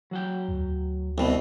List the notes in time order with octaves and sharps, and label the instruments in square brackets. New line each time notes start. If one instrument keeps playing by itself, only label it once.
[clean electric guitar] F#3 F#4 G5
[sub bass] D2
[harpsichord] C2 B2